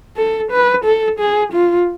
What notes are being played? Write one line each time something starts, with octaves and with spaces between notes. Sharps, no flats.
A4
B4
A4
G#4
F4